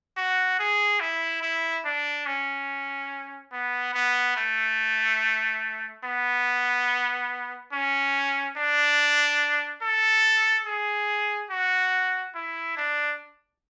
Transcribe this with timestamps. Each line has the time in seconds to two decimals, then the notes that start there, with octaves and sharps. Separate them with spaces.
0.17 F#4
0.59 G#4
1.00 E4
1.42 E4
1.85 D4
2.26 C#4
3.53 B3
3.94 B3
4.37 A3
6.04 B3
7.73 C#4
8.58 D4
9.82 A4
10.66 G#4
11.50 F#4
12.35 E4
12.77 D4